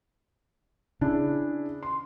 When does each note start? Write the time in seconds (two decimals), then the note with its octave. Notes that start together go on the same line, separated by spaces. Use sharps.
1.01 C#3 D4 E4 G#4
1.83 C6